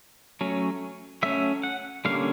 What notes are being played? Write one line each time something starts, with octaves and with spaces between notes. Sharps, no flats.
F#3 A3 C#4
F#3 A3 C#4 E5
F#5
D3 G3 A#3 C#4 F5